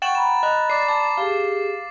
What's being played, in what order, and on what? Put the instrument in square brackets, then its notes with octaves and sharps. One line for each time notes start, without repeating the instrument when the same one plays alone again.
[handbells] F#5 G5 [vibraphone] C#6 [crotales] A6 E7 F#7
[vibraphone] A#5 B5 [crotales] E7
[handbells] D#5 F#6
[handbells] D5 [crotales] D6 C7
[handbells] A5 [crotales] D6
[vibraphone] G4 G#4 [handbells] F5